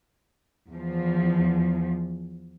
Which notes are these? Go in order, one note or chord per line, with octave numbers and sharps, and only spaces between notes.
E2 F3